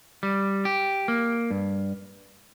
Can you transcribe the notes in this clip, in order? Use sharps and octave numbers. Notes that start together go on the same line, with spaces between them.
G3
G4
A#3
G2